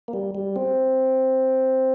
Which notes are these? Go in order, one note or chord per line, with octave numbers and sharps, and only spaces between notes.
A#3
G3
G3
C4